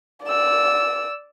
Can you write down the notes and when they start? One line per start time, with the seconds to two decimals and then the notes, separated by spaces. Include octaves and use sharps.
0.23 D5 E6